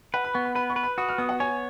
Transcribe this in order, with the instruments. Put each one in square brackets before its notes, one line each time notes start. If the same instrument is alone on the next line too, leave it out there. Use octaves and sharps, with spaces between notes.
[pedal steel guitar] B4 [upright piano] F#5
[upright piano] B5
[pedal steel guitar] B3 [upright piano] C#6
[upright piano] B5
[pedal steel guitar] B4 [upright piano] B5
[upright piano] C#6
[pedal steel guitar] B4
[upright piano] B5
[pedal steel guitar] F#4 [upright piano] D#6
[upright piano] F6
[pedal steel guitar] B3 [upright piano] D#6
[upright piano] F#5
[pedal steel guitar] C#5 [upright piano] G#5